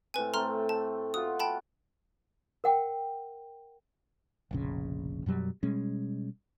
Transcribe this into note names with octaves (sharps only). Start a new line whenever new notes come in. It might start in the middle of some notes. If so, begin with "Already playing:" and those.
A2 C4 B4 G#5
A3 C4 A#5 C6 F6
A5
B3 F4 F#4 D#6
G5 A5 B5
A#4 F#5 G5
F1 A#1 C#3
F#2 B2 F#3 G3
B2 G3 G#3 C#4